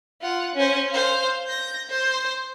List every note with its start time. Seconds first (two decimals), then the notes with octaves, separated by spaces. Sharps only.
0.21 F4 F#5
0.55 C#4 C5
0.90 C5 F5
1.46 G6 A#6
1.89 C5